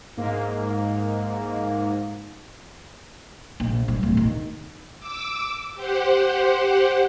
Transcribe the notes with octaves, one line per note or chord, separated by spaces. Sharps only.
G#2 A#3
A#1
G2
D1
D#3
D6 E6
G4 C5 F#5